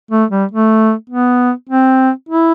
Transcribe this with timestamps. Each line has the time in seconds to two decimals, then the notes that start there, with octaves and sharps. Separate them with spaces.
0.11 A3
0.31 G3
0.51 A3
1.10 B3
1.69 C4
2.29 E4